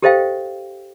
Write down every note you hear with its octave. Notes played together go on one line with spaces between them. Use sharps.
G4 A4 C5 D#5 F5 G5